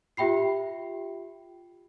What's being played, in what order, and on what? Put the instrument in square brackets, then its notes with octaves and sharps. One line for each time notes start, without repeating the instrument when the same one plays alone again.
[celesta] F4 G4 E5 G5 B5 C7